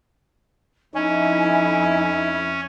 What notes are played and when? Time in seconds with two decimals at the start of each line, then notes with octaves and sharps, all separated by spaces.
0.95 F2 C#4 D#4 E4 G#5